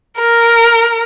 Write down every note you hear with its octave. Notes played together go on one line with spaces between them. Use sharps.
A#4